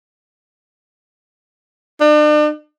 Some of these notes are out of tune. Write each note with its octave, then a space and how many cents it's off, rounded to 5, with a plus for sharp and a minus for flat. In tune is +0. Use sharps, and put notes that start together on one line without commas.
D4 +40